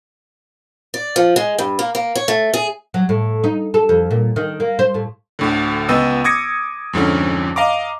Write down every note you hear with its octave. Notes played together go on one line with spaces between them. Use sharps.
D5
F3
G#3
G2
A#3
A#3
C#5
A3
G#4
F#3
A2
D#4
A4
F2
A#2
D#3
A#3
C5
A2
D2 A2 D3
C#2 B3 D#5 E6
D6 D#6 G#6 A#6 C#7
F2 G#2 D3 C#4
D#5 F5 A#5 D6